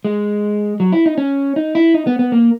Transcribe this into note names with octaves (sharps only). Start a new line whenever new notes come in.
G#3
F#3
E4
D#4
C#4
D#4
E4
D#4
B3
B3
A#3